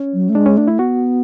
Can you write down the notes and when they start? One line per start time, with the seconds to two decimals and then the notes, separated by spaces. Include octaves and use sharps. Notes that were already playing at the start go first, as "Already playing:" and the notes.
Already playing: C#4
0.14 F#3
0.29 A3
0.35 G#3 D4
0.46 C#4
0.57 A3 D4
0.67 E4
0.78 B3 F#4